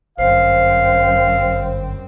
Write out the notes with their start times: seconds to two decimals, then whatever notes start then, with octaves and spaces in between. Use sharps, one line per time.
0.18 G1 F#2 C4 C5 F5